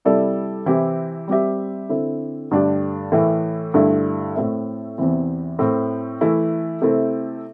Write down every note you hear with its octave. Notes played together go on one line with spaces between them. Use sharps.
C3 G3 E4 A4 D5
C3 E3 C4 E4 G4
G3 C4 G4 E5
D3 C4 E4 A4
G2 D3 A3 D4 G4
A2 E3 A3
G2 D3 A3 E4
A2 A3 C4 A4 E5
E2 C3 E3 C4
A2 A3 C4
E3 A3 E4
C3 A3 C4 E4 A4